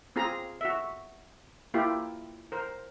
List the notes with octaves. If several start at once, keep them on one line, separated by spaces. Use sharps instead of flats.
C4 F4 G#4 A#5
F#4 E5
A#3 E4 F4 G4
A#4 C5